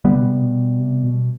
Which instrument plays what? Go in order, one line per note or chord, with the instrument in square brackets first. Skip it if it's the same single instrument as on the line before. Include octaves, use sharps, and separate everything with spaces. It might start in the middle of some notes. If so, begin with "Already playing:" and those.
[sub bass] D3 [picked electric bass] G3 B3
[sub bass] C3
B2
C3
B2
C3
B2